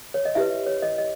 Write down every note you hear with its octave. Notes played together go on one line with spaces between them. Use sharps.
C#5
D#5
E4 G4 B4 E5
C#5
D#5
D#5